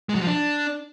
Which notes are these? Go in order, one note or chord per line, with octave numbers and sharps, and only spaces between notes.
G#3
F#3
F3
D4